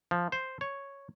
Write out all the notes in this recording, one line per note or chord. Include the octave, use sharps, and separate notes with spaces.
F3
C5
C#5